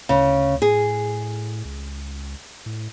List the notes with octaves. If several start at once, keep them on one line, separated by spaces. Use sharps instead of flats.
D2 C#3
A2 G#4
C#2
A2